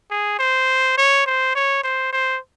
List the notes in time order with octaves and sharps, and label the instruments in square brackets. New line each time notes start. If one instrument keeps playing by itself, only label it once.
[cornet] G#4
C5
C#5
C5
C#5
C5
C5